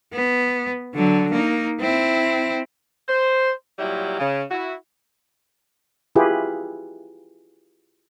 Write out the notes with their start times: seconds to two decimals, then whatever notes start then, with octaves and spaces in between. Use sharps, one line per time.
0.13 B3
0.94 D3 F#3
1.31 A#3 D#4
1.80 C4 E4
3.08 C5
3.78 A#2 F#3 G3 E4 G4
4.19 C#3
4.50 E4 F#4
6.16 E4 F4 G4 G#4 B4